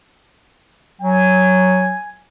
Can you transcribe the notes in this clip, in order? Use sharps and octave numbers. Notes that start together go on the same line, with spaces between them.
F#3 G#5